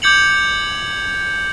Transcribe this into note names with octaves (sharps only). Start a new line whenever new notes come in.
D6 G6 G#6 C#7 F7 F#7